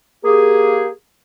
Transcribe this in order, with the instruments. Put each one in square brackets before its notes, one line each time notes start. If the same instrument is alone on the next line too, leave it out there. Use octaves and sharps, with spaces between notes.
[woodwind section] A#3 G4 G#4